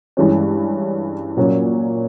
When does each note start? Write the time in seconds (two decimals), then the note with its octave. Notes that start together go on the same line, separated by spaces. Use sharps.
0.17 G2 E3 G#3 C#4
1.37 A#2 F#3 A#3 C#4